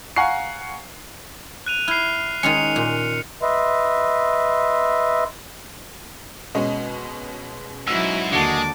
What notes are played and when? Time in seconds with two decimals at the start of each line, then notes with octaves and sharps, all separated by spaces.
0.16 F5 F#5 G#5 A#5 C#6 C7
1.66 F#6 D#7 F7
1.88 E4 F6 C7
2.43 D#3 G#3 C#4 C#7 F7
2.76 A#2
3.42 B4 D#5 E5 C6
6.55 B2 G#3 C#4 D#5
7.87 G#2 F#3 E4 F#4 E6
8.32 D#2 D3 G#3 F#4 A5 D6 C#7